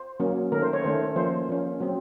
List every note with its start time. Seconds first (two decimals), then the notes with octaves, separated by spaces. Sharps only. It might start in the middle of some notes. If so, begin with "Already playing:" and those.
Already playing: C5
0.20 F#3 A#3 C#4
0.52 D#3 A3 C#4 A#4
0.62 C5
0.73 C#5
0.84 D#3 A3 C#4 C5
1.16 F3 A#3 C#4 C5
1.49 F3 A#3 C#4
1.80 F#3 C4